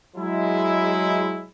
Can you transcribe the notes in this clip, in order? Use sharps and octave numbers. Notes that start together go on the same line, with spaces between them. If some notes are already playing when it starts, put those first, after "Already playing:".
F#3 G#3 E4